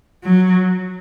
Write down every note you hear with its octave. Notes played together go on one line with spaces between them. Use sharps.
F#3